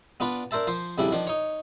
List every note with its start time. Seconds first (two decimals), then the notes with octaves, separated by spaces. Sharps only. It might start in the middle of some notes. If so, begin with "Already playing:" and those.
0.20 B3 D4 F4 B4 D5
0.51 D4 A#4 C5 E5 A5
0.67 F3 C5
0.98 F2 C#3 G3 D4 E4
1.12 D#3 F3 D4
1.27 D#4 C#5